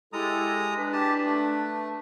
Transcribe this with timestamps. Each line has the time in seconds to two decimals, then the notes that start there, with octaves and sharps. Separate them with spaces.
0.13 G#3 E4 G4 A4 A#5 D#6
0.76 D4 B4
0.93 G4 A5
1.25 A3